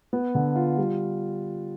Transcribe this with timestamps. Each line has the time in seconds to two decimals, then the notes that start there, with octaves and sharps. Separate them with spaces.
0.13 B3
0.35 D3
0.56 F4
0.78 G3